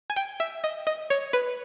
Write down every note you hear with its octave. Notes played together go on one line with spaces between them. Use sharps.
G#5
G5
E5
D#5
D#5
C#5
B4